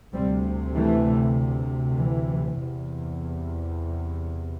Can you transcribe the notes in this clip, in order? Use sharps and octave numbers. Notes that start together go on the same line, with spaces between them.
D2 C3 G3 C4
E3 A3
E3
E2 C3